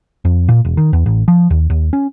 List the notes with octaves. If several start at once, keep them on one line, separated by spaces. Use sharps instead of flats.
F2
A#2
E1
D#3
E2
A1
F3
D#2
D#2
C#4